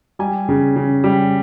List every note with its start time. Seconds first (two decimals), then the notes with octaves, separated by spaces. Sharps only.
0.19 G3 G#5
0.48 C#3
0.76 C#3
1.04 G3